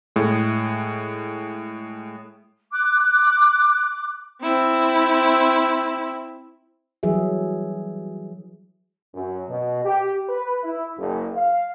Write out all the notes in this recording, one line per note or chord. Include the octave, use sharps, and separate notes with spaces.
A2 G#3
D6 F#6
C4 E4
E3 F#3 G3 G#4 E5
F#2
B2
G4
B4
E4
F#1
F5